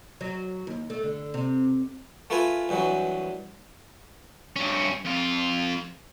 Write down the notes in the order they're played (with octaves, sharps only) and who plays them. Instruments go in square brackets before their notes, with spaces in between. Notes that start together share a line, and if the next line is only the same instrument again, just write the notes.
[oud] F#3
D#2
A3
D3
C3
[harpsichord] A3 F4 A#4 B4 G#5
C2 G2 E3 F#3
[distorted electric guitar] G2 C#4
F2 F4